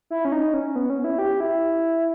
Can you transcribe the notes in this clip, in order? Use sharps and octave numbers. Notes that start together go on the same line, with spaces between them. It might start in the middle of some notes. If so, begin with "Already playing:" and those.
E4
C#4
D#4
C#4
B3
C#4
E4
G4
E4